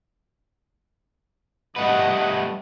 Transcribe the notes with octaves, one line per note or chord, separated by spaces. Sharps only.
G3 A3 B4 D#5 F#5